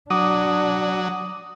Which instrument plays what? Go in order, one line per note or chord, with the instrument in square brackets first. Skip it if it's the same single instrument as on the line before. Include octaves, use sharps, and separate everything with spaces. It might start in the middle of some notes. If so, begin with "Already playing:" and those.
[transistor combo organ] F#3 [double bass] D4 [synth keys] D6 D#6 D#7